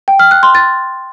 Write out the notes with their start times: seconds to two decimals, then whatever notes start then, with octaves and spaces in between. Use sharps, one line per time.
0.08 G5
0.19 F6
0.31 F#6
0.43 C6
0.55 A6